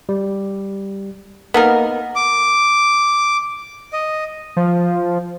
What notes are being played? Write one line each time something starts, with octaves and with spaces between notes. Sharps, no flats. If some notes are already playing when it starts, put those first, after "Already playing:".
G3
A#3 B3 D#4 A#4
D6
D#5
F3